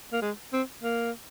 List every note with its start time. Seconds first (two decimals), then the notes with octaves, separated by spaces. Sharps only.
0.12 A#3
0.22 G#3
0.53 C4
0.83 A#3